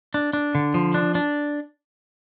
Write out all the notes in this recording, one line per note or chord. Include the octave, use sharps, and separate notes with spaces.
D4
D4
D3
F3
D4
D4